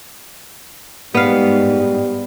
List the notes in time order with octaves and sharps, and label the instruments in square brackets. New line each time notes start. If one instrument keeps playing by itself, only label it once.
[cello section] G#2 [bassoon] G3 [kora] B3 F5